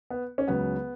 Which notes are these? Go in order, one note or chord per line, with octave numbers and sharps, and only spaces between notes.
B3
C#4
C#2 C#3 F#3 B3